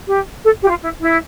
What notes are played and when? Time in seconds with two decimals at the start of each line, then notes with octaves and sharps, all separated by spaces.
0.07 G4
0.44 A4
0.62 G4
0.69 F4
0.82 E4
1.00 E4